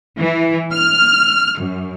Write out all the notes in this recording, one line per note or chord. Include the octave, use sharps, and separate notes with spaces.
E3
F6
F#2